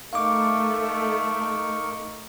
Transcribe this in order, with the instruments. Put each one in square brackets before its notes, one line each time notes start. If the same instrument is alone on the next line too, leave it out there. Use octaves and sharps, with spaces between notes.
[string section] A3 [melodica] D#4 A#4 C#6 [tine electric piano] F5 D6